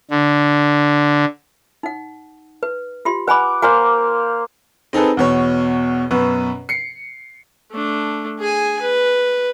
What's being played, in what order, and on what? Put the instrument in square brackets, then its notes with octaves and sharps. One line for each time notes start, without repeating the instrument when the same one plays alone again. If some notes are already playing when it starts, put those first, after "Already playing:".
[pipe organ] D3
[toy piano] D#4 F#5
B4
F4 G4 C6
[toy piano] B4 G#5 B5 [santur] F#5 D6
[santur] A#3 C5 F5 [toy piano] F#5 G#5
[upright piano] C4 D#4 G#4 A4 B4
E2 B2 C#5
F#2 B2 B4 C#6
C7 C#7
[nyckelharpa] A3 D4
G#4 G#5
B4